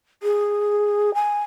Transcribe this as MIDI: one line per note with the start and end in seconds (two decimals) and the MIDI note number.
0.23 1.14 68
1.14 1.43 80